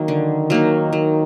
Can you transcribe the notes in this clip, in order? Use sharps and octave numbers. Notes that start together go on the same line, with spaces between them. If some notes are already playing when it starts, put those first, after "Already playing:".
Already playing: D#3 F#3 A#3
D3
F#3 A#3 D#4
F#3